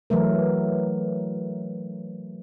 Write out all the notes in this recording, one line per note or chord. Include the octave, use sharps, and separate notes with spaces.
E3 F#3 A3 A#4